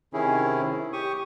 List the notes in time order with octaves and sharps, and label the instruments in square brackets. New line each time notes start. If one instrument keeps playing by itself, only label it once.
[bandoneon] C3 D#3 C#4 E4 G#4
G4 C#6 D#6